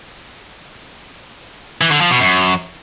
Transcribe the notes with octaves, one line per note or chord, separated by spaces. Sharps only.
E3
D3
F3
B2
F#2